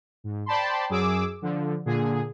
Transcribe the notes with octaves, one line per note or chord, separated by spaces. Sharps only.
G#2
C5 D5 G5 A5 B5 C6
F#2 G#4 D6 E6
D3 F3
A#2 D3 G#4